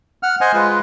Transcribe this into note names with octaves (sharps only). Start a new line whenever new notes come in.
F#5 F6
C5 D#5 F#5 G#5
G#3 F4 B4